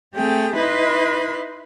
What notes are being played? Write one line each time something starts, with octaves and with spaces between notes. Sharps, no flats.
A3 C4 G4 G#4 G5
D#4 E4 B4 D#5 B5 C6